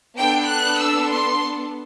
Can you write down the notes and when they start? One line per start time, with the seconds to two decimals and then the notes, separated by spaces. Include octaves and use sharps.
0.17 B3 D4 A4 G5
0.48 F#6
0.78 E6
1.09 C6